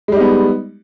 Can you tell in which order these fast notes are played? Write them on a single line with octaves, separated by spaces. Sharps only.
G#3 G3 D#4 B3